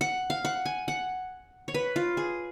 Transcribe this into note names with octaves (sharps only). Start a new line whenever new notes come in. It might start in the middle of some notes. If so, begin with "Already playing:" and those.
F#5
F5
F#5
G#5
F#5
C#5
B4
F4
G#4